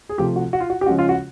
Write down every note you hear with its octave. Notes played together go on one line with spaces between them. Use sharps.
G#4
C3 F3 A3 G4
F#4
F#4
F4
F#4
G4
C#3 F3 G#3 C#4 F#4
F4
F#4